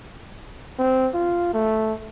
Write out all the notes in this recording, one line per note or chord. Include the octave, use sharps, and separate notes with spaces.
C4
F4
A3